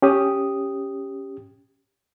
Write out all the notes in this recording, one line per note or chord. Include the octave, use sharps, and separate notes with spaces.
C#4 G4 D#6